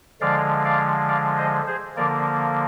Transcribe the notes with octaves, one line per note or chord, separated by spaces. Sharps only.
D3 F3 G#3 D5 F5
D5 F5
D5 F5
C5 D#5
G#4 C5
D3 F3 A#3 A#4 D5